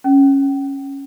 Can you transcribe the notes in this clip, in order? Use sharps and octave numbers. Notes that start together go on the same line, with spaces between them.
C#4